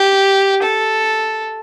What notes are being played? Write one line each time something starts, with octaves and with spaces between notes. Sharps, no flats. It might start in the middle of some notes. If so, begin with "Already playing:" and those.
Already playing: G4
A4